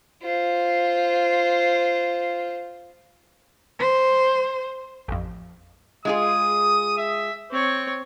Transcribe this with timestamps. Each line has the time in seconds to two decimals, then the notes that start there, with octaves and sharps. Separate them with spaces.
0.22 F4 C5
3.79 C5
5.08 A1 F2
6.05 G#3 F4 G#4 D#6
6.97 E5
7.52 C4 C#5 C#6